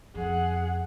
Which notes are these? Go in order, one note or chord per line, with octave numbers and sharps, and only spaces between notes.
F2 G#4 F#5